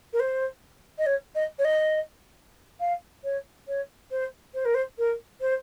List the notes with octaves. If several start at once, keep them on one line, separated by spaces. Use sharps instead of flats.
A#4
C5
D#5
C#5
D#5
C#5
D#5
F5
C#5
C#5
C5
C5
A#4
C5
A#4
C5